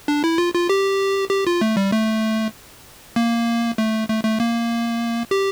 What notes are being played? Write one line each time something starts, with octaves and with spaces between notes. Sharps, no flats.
D4
E4
F4
F4
G4
G4
F4
A3
G3
A3
A#3
A3
A3
A3
A#3
G4